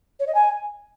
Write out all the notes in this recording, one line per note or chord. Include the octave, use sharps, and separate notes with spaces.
C#5
D#5
G#5